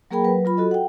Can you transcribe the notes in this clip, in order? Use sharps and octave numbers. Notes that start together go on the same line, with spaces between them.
F#3 A#3 G#4 A#4 G5 B5
F#3 B4
F#3 F4 B5
F#4 A4 D#5
F#5 G5